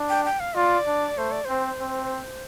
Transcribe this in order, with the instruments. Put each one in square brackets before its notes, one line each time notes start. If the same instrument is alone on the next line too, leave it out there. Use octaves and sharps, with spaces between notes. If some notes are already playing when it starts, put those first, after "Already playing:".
Already playing: [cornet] D4
[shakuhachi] G5
G5
F5
[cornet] F4 [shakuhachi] D5
[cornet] D4
[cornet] A3 [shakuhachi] C5
[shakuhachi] D5
[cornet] C4 [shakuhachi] C5
[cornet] C4